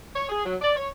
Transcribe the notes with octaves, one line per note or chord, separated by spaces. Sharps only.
C#5
G#4
F#3
D5
C#5